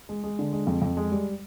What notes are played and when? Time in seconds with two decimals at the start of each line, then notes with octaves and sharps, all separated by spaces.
0.09 G#3
0.24 G#3
0.39 D3
0.53 G#3
0.67 F2
0.82 F2
0.97 G#3
1.12 G3